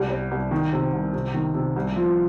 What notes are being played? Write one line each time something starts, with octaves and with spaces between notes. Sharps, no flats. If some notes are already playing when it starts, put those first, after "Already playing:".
Already playing: C2 G3
G3
C2
D#3
C3
C2
C3
D#3
C3
C2
F3